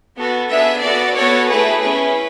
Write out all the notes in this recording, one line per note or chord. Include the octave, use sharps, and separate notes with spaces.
B3 F#4 A4
B3 D4 G#4 E5
B3 F#4 A4 D5
B3 F#4 A4 C#5
A3 E4 G#4 B4
C#4 E4 G#4 B4